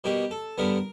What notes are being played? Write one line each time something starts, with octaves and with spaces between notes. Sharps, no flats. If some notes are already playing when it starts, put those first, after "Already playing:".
B2 G3 A#3 G4
A4
G2 D3 G3 B3 A#4